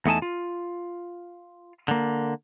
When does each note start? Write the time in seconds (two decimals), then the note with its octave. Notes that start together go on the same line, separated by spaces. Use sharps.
0.06 E2 A3 D#4 G#5 A5
0.22 F4
1.88 D3 A#3